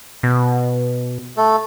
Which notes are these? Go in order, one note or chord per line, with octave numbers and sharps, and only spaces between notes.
B2
A3 A4